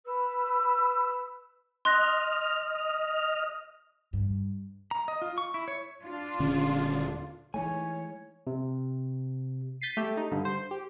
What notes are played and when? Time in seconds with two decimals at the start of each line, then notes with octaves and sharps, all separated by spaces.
0.05 B4 E6
1.85 D#5 C6 F6 F#6 A#6
4.13 G2
4.91 A#5
5.08 D#5
5.22 F4
5.38 C#6
5.54 E4
5.68 C#5
6.04 D4 F4
6.39 D#1 D3 C#4
7.54 E3 G#3 A3 D#4 C#5 G#5
8.47 C3
9.81 G6 A6 B6 C7 D#7
9.97 A3 G4
10.17 D#4
10.31 G2 D3
10.45 C5
10.71 G4